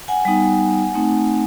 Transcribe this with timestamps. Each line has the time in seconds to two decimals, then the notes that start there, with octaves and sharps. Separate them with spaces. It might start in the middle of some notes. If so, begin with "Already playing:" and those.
0.08 F#5 G#5
0.25 G3 B3 D#4
0.95 A3 C4 D#4